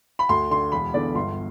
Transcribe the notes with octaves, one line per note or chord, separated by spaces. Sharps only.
B5
D2 C6
D3 C6
E1 B5
E2 D3 D5
G1 C6